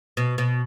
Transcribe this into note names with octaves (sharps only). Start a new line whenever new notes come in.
B2
B2